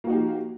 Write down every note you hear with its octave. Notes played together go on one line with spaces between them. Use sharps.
F3 A#3 D#4 F#4 G4